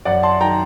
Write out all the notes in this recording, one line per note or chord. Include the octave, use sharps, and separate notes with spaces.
F#2 D5 F#5
A5 C6
D#3 F#3 G5 A#5